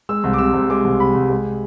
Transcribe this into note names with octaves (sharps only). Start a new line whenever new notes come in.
G#3 E6
C2
D6
C3 E6
C2
G#3 D6
C2
C3 B5
C2
G#3